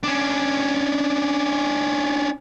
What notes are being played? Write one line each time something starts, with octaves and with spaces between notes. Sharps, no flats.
C#4 D4